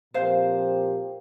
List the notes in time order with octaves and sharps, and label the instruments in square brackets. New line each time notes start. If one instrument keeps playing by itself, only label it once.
[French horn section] A#2 F3 C4 G4 A#4 [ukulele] C5 F5